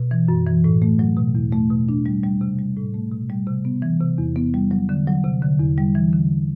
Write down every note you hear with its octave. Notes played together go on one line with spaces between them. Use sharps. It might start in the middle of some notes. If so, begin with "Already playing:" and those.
Already playing: B2
E3
F#2
E3
A2
A3
F#3
B2
E2
A3
B2
D4
G3
G3
C3
G3
A2
A3
B2
G3
C3
B3
E3
C3
E2
B3
G3
F#3
D3
F#3
C3
D3
E2
G3
E3
D3